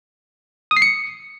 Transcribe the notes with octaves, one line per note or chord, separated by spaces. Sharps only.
D#6
C7
C#7